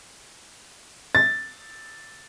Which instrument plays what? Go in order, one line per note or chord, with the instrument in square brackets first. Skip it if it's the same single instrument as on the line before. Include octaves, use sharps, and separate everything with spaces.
[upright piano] A6